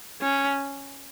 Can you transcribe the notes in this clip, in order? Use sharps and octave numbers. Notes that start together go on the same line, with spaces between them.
C#4